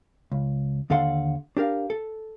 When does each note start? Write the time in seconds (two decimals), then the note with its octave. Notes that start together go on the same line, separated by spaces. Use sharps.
0.32 C#2
0.90 D#2 D3 A4 F5 F#5 C6
1.57 D4 G4 A#4 F5
1.90 A4